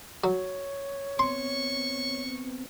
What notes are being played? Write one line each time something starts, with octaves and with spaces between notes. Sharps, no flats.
F#3 C#5
B3 C4 C6 C#6